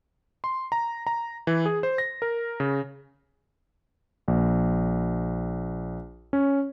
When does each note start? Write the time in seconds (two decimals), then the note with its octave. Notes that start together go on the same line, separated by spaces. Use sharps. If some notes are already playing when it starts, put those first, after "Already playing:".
0.44 C6
0.72 A#5
1.07 A#5
1.47 E3
1.66 G#4
1.83 C5
1.98 A#6
2.22 A#4
2.60 C#3
4.28 A#1
6.33 C#4